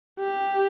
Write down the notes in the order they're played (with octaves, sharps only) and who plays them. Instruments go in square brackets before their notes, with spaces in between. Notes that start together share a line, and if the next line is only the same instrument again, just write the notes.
[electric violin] G4